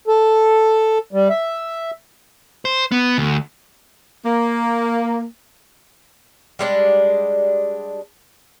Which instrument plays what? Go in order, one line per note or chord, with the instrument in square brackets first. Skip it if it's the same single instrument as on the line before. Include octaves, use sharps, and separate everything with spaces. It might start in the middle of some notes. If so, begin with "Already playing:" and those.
[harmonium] A4
G3
E5
[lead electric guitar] C5
B3
D2
[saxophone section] A#3
[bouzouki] G3 G#3 D4